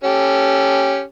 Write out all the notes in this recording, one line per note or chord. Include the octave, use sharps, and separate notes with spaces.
C#4 G4 A4